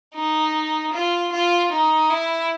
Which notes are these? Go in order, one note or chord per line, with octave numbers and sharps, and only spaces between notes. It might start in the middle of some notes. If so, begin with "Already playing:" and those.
D#4
F4
F4
D#4
E4